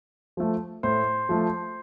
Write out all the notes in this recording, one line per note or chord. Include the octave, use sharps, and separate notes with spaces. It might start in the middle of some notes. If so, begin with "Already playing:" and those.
F3 A3
A2 C5
F3 A3